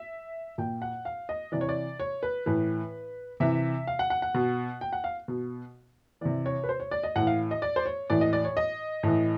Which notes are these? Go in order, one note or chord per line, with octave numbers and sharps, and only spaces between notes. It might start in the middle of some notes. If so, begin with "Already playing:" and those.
Already playing: E5
A#2 G5
F#5
F5
D#5
C3 E3 D5
C#5
D5
C#5
B4
A2 E3 B4
C3 E3 E5
F5
F#5
F#5
F#5
B2
G5
F#5
F5
B2
C3 E3 D5
C#5
B4
C5
C#5
D5
D#5
A2 E3 F#5
F5
D#5
D5
C5
C#5
A2 E3 D5
D#5
D5
C#5
D#5
A2 E3